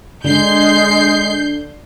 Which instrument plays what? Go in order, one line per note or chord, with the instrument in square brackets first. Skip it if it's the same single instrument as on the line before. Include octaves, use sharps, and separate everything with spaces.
[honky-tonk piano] D3 [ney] G#3 [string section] G6 C7